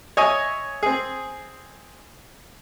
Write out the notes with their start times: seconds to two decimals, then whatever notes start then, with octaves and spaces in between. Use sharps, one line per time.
0.17 C#5 D#5 E5 G#5
0.83 C4 G#4